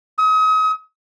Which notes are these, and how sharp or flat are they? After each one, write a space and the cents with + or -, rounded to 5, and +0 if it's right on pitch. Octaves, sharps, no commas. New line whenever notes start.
D#6 +35